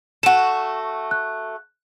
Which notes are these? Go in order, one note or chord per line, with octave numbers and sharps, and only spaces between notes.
A3 F#4 F#5 E7
F#6